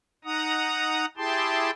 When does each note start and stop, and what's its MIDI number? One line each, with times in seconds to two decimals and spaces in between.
0.25 1.06 63
0.25 1.06 78
0.25 1.06 82
0.25 1.06 87
1.17 1.71 64
1.17 1.71 67
1.17 1.71 68
1.17 1.71 79
1.17 1.71 81
1.17 1.71 84